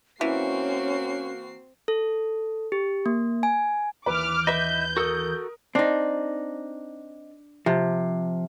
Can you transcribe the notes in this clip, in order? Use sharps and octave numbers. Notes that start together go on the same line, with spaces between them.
E3 A#3 C4 C#4 F#4 C7
A4
G4
A#3
G#5
D#2 E3 B4 D6 F6
B4 D#5 E5 G6
F#4 A4 A#4 D#6
C4 D4 D#4
C3 F3